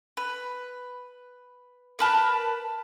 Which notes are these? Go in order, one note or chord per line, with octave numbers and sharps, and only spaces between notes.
B4
A#4 B4 A5 B5